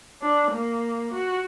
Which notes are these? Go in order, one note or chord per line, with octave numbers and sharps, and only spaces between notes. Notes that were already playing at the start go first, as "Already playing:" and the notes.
D4
A#3
F#4